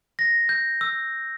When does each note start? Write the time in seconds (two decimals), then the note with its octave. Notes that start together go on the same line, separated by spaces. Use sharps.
0.19 A#6
0.49 G6
0.81 E6